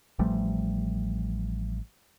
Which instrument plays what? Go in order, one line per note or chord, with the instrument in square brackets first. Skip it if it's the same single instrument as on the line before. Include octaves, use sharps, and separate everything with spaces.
[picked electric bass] A1 F3 G3 A3